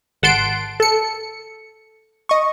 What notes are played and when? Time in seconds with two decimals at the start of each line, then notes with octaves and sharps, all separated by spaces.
0.22 G#1 F#5 A5 C6 D7
0.80 A4 C#7
2.29 D#5 C#6